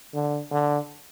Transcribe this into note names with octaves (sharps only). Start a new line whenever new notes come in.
D3
D3